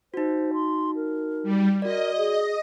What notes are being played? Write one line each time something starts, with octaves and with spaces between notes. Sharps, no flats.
D#4 F#4 C5
C6
A#4
G3
F#4 A#4 D5 D#5
G#4